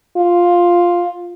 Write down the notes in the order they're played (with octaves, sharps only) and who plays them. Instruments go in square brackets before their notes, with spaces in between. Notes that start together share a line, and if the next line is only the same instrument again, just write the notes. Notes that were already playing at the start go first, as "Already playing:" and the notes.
[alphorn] F4